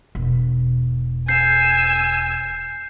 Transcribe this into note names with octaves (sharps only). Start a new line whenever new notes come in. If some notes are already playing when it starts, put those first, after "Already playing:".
E1
G#5 E6 G6 C7